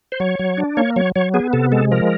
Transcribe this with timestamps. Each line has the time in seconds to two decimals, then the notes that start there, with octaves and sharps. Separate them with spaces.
0.12 C5
0.20 F#3 C#5
0.39 F#3
0.58 D4
0.77 A#3 C#5
0.96 F#3 C#5
1.16 F#3 C#5
1.34 B3 G#4
1.53 C3 A4
1.72 G#3 A4
1.91 F3 A#4